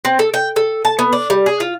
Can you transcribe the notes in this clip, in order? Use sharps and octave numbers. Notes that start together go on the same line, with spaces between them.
C4
A4
G5
A4
A5
B3
D4
G3
G#4
F4